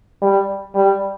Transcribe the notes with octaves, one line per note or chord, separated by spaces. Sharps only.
G3
G3